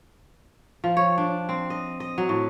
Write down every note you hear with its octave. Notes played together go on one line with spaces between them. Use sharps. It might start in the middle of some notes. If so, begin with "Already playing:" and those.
F3
C#5
D4
C4
D#5
D#5
F#3
A2